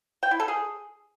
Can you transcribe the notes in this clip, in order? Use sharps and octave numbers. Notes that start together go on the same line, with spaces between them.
G5
E4
A4
G#4